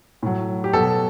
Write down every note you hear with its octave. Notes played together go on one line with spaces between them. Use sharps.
A2 F#3
G4
B2 F#3 A4